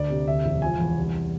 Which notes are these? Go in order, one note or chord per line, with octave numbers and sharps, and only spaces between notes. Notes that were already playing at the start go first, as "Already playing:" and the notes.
Already playing: D2 D5
C3
D2 E5
E1
F3 G#5
E2
C2